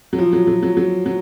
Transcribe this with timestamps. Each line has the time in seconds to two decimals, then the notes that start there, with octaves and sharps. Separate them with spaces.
0.13 F#3
0.18 F3
0.33 F#3
0.47 F#3
0.63 F#3
0.77 F#3
1.06 F#3